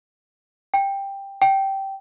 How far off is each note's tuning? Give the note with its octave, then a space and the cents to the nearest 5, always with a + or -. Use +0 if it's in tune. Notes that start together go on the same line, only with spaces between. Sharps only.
G5 +10
G5 -10